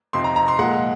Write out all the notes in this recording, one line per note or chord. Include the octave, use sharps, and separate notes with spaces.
F2 C3 F3 C4 D#4 C6
A#5
A#5
C6
A#2 F3 G#3 F#5